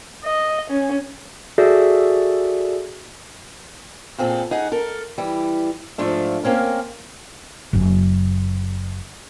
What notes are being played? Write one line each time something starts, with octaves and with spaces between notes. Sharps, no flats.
D#5
C#4
F#4 G#4 A4 D5 E5
A#2 C4 G#4 A4
D#4 G#4 F#5
A4 A#4
E3 G3
G#2 F3 A3 D4 E5
A#3 C4 C#4 A#4
F#1 F#2